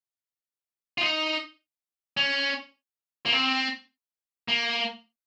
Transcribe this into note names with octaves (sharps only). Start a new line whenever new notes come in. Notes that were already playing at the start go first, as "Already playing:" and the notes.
F4
D#4
C#4
A#3
C4
A#3